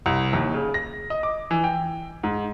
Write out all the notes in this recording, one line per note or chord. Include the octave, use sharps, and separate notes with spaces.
C2
D#2
C#3
A#6
D#5
D6
E3
G5
G#2